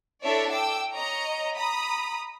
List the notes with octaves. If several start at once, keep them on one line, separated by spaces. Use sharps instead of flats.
D4 E4 A4 C#5 D5 E5
G5 D6 E6
C#5 D#5 A#5
A#5 B5 D#6